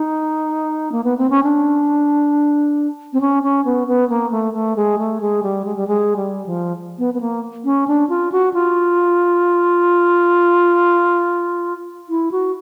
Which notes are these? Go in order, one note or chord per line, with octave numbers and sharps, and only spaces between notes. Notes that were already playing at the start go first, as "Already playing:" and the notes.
Already playing: D#4
A#3
B3
C4
C#4
D4
C4
C#4
C#4
B3
B3
A#3
A3
A3
G#3
A3
G#3
G3
G#3
G3
G#3
G3
F3
B3
B3
A#3
C#4
D4
F4
F#4
F4
E4
F#4